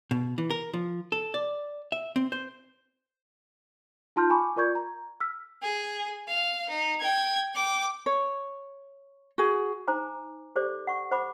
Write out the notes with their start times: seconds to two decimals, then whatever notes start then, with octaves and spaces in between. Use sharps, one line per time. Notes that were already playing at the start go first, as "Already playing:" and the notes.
0.11 B2
0.38 E3
0.50 A#4
0.74 F3
1.12 A4
1.34 D5
1.92 E5
2.16 C4
2.32 C5
4.16 D#4 F4 A5 C6 F6 G6
4.30 G#5 B5 C#6 D6
4.56 F4 A#4 D5 C#6 G6 G#6
4.75 A#5
5.20 E6 F6 B6
5.62 G#4
6.28 F5
6.69 D#4
7.00 G5 G#6
7.54 G5 D6
8.06 C#5
9.38 F#4 G#4
9.87 D#4 C5 G#5 A#5 D6
10.56 G4 A4 C5 D5 D6
10.87 F#5 C#6
11.11 C5 F#5 B5 D6